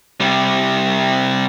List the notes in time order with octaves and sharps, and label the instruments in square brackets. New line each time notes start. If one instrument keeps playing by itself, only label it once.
[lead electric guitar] C3 G3